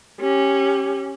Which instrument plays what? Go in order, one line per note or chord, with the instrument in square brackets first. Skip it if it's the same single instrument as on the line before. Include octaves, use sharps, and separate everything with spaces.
[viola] C#4 [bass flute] G4